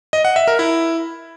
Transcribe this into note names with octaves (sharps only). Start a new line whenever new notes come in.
D#5
F#5
E5
A#4
E4